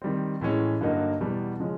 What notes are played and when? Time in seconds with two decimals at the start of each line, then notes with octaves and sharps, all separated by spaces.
0.02 D#3 G3 C4
0.41 A2 E3 G#3 C#4
0.81 G2 D3 F#3 A#3 D#4
1.20 E2 B2 G3
1.60 C#3 F3 G#3 C#4